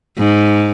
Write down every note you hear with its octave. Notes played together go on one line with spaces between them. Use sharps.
G#2